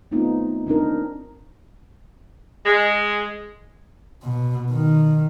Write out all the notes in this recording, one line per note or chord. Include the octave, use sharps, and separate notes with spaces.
A3 B3 C4 D#4 F4
C4 D4 D#4 A#4
G#3
B2
D#3